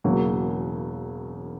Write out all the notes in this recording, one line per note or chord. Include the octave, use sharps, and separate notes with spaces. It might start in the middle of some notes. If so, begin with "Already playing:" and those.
E1 E2 C#3 F#3 A#3